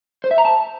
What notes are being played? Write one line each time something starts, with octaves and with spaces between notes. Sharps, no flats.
C5
E5
A#5
A5